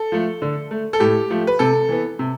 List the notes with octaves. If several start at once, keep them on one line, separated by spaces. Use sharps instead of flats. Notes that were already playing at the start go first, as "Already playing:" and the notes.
Already playing: A4
F3 A3
D3
A3
A4
A2 G4
F3 A3
B4
C3 A4
E3 B3
C3